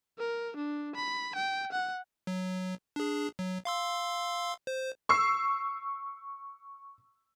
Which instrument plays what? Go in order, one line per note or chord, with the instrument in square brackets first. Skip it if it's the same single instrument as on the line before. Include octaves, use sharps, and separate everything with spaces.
[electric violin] A#4
D4
B5
G5
F#5
[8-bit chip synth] F#3
D4 G#4
F#3
F5 C6 E6
C5
[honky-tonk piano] C#6 E6 C7